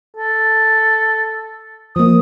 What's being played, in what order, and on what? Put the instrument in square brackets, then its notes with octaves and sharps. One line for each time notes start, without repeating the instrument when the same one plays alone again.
[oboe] A4
[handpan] F3 A#3 [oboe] D#6